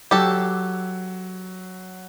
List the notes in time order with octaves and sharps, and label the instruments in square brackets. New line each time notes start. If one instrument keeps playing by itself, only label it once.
[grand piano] F#3 [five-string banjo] G4 A4